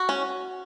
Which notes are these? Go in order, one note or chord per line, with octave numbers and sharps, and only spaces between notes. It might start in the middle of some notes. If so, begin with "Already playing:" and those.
Already playing: F#4
C#4